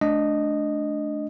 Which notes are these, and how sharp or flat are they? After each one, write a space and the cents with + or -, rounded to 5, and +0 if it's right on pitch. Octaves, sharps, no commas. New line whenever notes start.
A3 -30 D4 +0 D#5 -10